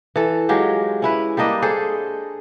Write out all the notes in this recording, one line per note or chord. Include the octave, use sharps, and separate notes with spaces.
E3 A4
F#3 G#3 F4 G4
C#4 E4 B4
G3 A#3 D4 D#5
G#4 A4 C5